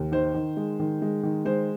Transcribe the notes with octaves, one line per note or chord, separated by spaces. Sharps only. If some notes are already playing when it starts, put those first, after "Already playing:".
Already playing: D#2
D#3 C5
D#3
G#3
D#3
G#3
D#3
G#3 C5